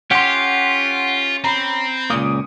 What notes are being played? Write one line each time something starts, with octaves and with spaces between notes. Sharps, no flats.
C#4 F4 G4 F#5 C6
C4 A#5 B5
C#2 A#2 A#3 D#6